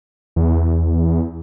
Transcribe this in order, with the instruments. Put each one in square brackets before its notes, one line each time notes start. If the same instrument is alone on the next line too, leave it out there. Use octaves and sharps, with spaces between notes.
[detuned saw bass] E2